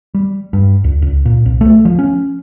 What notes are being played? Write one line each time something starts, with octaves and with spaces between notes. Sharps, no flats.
G3
G2
C#2
C#2
A#2
C2
A3
F3
C#4